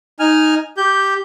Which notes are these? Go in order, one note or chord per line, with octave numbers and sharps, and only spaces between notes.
D#4 G#5 F6
G4 G6